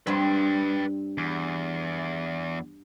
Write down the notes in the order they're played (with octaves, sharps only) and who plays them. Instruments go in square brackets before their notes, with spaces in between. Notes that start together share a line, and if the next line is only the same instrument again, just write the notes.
[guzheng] G2 C4 [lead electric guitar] B4 G5
[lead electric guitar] E2